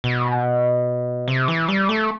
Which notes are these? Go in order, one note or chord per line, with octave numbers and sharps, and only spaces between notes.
B2
C3
E3
G3
A3